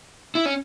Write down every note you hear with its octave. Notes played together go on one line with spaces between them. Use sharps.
E4
C#4